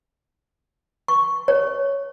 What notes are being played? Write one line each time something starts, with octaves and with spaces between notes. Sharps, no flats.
C#6
C#5